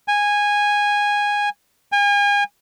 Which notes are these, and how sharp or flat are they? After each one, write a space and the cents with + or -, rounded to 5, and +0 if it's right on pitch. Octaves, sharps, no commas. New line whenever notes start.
G#5 -10
G#5 -35